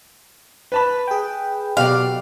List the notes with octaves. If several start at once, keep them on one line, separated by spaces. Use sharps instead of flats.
B4 A5 B5
G#4 G5
B2 F#3 G4 D5 F5